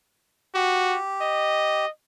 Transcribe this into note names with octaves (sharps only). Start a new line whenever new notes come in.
F#4 G4
D#5